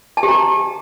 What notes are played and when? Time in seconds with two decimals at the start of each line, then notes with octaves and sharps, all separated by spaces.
0.17 A5
0.23 G4
0.29 A#5